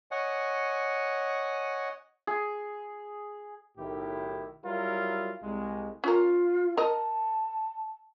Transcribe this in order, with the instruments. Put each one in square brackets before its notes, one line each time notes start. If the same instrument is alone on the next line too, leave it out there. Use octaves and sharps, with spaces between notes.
[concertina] C#5 D#5 F#5 G#5
[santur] G#4
[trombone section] B1 A2 D#3 E4 G4
F#3 G3 E4 F4 A#4
C2 G#3
[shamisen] C#4 A#4 [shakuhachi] F4
[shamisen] A#4 D#5 [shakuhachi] A5